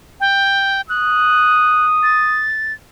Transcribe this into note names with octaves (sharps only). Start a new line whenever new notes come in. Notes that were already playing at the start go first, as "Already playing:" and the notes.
G5
D#6 F#6
A6